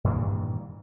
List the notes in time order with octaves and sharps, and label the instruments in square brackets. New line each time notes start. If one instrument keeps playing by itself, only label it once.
[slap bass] G2 A#2 D#3 E3